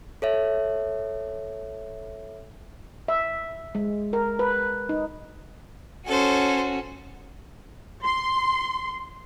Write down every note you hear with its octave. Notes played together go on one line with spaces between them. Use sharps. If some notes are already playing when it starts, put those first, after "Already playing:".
A4 C#5 E5
E5
G#3
A#4
B4
D#4
C#4 F#4 A4 C5
C6